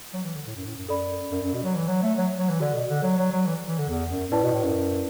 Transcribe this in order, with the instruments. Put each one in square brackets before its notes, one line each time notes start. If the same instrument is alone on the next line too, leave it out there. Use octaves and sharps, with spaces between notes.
[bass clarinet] F#3
E3
D3
A2
F#2
A2
F#2
[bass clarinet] F#2 [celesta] A4 D5 B5
[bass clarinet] F#2
F#2
B2
F#3
E3
F#3
A3
F#3
F#3
E3
[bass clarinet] D3 [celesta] F#4 A4 D5
[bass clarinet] B2
D3
F#3
F#3
F#3
E3
E3
D3
E2
F#2
[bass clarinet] A2 [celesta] E4 B4 D5 A5
[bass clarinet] B2
A2
F#2